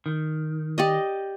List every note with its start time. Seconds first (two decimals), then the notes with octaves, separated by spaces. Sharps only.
0.06 D#3
0.78 G4 D5 D#5